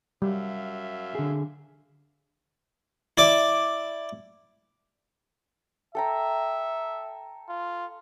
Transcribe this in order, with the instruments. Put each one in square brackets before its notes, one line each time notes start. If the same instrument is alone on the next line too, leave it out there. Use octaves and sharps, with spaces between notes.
[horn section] F#2 E5 F5 [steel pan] G3
[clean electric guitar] D3 G#4
[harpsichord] E4 D5 D6
[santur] A4 G5 A#5 [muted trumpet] E5
[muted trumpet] F4